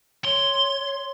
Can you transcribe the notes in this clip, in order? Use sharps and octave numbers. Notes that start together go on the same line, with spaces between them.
C#5 C6